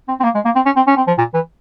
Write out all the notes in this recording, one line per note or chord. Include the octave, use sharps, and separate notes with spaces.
C4
C4
A#3
G#3
A#3
C4
C#4
C4
C#4
C4
F3
A#2
E3